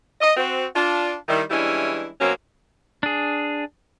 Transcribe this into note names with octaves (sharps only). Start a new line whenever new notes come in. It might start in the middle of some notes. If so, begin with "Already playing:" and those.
D#5
C4 F#4
D4 F4
D#3 G3 E4
E3 G3 G#3 C#4 D4 E4
B2 F#3 A#3 C4 C#4
D4 G#4